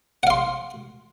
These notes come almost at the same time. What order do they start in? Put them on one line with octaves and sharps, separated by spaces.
F#5 F5 C6